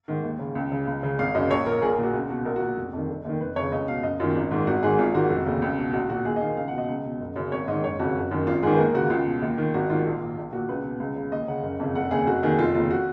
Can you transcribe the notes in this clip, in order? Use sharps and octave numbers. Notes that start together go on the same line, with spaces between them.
G#2 D#3
D#2
C#3
C#2
C#3
C#2
C#3
G#1 F5
F#2 C#3 D#5
A#1 C#5
A#2 A#4
A#1 G#4
A#4
G#4
A#2 F#4
C#2
B2 F#4
A#1 A#4
F#4
A#2
F1
F2 D#3
F1
D#2 D#3
F1 B4
F2 C#3 C#5
C#2 D#5
B2 F5
F#1 D#5
F#2 D#3 F4
G#1
G#2 D#3
G#1 F#4
G#2 D#3 G#4
G#1 F4
G#2 D#3 F#4
F1
D#2 C#3
C#2
B2
A#1 F#4
A#2 F#4
D#2 G#4
D#5
D#3 F5
C#2 F5
F#5
B2 D#5
C#2
B2
F#1
F#2 C#3
G#1 C#5
G#2 D#3 D#5
F#1 C#5
F2 C#3 F#4
F#1
F#2 D#3
G#1 F4
G#2 D#3 G#4
B4
D#2 A#4
C#3 F#4
C#2 F4
B2
D#2
D#3
G#1 F#4
G#2 D#3 F4
A#1
A#2
A#1
A#2 F#4
C#2 B4
B2
C#2
C#3
D#2 D#5
C#3 F#5
F#1
F2 C#3
F1 F#5
D#2 C#3 G#4
F1 F#4
D#2 D#3 G#4
F1 F4
D#2 C#3 F4
F#4